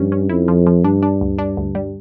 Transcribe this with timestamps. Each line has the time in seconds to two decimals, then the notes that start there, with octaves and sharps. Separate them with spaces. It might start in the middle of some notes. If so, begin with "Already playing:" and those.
Already playing: G2 F3 C#4
0.12 C#4
0.29 F2 E4
0.48 F3
0.67 F3
0.84 G2 D4
1.03 D4
1.21 D2
1.39 D4
1.57 D2
1.75 G3